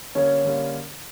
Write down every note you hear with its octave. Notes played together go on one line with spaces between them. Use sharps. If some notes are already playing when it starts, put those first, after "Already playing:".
D3 G3 A#3 C#4
D3 G3 A#3